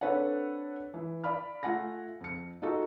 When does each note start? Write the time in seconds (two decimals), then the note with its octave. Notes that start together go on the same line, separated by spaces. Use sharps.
0.01 C4 D4 A4 B4 C#5 F#5
0.94 E3
1.24 D5 F5 B5 F6
1.63 A3 F4 F#5 G#5 A#6
2.21 F2 C#7
2.62 D#4 F4 F#4 A4